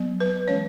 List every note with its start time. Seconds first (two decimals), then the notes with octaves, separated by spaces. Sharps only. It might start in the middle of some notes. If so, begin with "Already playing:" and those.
Already playing: F#3 B3
0.20 B4
0.48 E3 G#3 C#4 C#5